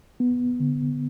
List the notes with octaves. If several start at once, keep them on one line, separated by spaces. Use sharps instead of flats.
B3
D3